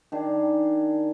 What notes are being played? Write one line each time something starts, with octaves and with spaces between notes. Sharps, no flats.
D#3 D4 G#4